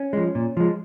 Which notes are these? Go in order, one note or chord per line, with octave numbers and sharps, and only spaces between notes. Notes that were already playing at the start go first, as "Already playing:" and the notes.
Already playing: C#4
F3 G#3
A#2
F3 G#3